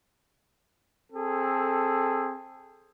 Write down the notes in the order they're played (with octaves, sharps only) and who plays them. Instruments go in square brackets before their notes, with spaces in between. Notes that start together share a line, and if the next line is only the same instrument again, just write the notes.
[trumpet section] C4 G#4 A4